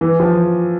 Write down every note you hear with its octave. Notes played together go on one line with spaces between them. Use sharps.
E3
F3